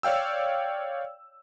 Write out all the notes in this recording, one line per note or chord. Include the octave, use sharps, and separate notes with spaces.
C#5 D5 F5 G5 E6